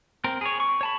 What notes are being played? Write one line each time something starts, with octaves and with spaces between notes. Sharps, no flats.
C4 A#4
G#4 C#5
C#6
C#5 A5 B5